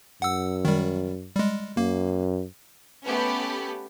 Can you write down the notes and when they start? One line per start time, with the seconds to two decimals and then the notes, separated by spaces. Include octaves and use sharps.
0.22 F#2 F#5 E6
0.65 D#3 G3
1.35 G3 G#3
1.77 F#2 A#3
3.05 A3 B3 C#4 G4 B4 B5